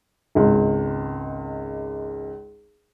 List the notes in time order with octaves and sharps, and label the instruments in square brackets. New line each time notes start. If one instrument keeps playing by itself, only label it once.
[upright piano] G#1 C#2